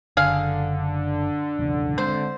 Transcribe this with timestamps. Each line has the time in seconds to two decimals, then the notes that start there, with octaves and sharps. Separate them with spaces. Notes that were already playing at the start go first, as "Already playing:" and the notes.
0.17 F#1 D3 G#4 F5
1.59 B1 E2 C#3
1.98 G#3 A3 C4 C5